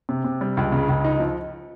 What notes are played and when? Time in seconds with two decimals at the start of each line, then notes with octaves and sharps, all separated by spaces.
0.09 C3
0.24 C3
0.41 G3
0.57 C#2
0.72 C#3
0.89 C#2
1.04 D#4
1.20 F3